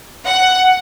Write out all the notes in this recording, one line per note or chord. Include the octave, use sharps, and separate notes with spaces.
F#5